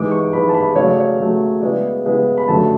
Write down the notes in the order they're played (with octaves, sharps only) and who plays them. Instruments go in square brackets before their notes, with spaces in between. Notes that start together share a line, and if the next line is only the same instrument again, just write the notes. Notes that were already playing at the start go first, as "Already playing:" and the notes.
Already playing: [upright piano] G#2 E3 G#3 D6
C#6
G#2 E3 G#3 B5
A5
B5
C#3 F#3 A3 C#5
D5
C#5
C#3 F#3 A3
C#3 G#3 B3 E4 D5
C#3 G#3 B3 E4
B5
F#2 D3 F#3 A3 A5